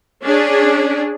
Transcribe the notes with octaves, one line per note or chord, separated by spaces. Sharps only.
C#4 D4 G#4